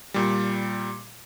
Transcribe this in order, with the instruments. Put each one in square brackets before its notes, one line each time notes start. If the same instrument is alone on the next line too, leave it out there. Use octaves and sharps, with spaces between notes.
[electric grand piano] A#2 G3